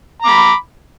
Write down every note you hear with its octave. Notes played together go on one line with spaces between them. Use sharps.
A#5 B5 D6